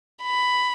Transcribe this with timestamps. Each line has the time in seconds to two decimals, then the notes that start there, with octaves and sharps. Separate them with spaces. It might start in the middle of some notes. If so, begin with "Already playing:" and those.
0.24 B5